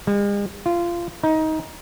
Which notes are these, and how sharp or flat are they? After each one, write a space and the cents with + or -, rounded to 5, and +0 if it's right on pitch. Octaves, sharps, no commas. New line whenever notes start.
G#3 -45
F4 -20
D#4 +20